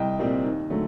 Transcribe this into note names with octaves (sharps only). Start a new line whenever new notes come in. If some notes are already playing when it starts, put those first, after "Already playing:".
Already playing: C2 D#5 G5
A#2 G3 C4 D#5
D#2
D3 F#3 A3